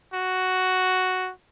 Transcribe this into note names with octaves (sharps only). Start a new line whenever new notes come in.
F#4